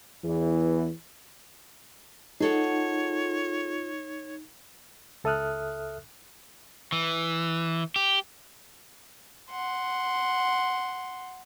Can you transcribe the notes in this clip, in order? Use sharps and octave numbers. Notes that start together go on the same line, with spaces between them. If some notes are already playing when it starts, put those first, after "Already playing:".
E2 E3
D#4 F4 G#4 A4 C#5 F#5
C#2 A4 E5 D#6 F6 F#6
E3
G4
F#5 C6